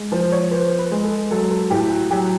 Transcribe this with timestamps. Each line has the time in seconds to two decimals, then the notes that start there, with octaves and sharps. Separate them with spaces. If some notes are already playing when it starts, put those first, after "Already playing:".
Already playing: G#3
0.12 F3 C5
0.32 C#5
0.51 B3 C5
0.79 B4
0.92 G#3
1.04 A4
1.31 F#3 A4
1.51 A4
1.70 A2 G4
1.91 F#4
2.11 F#3 G4